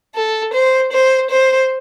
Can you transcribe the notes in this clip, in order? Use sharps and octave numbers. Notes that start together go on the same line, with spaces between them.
A4
C5
C5
C5